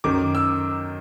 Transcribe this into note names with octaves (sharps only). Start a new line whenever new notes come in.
F#2 D#3 D6
E6